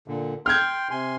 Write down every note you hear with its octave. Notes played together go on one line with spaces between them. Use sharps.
A#2 D3
G5 C6 F6 G6 G#6
C3 G#5 C6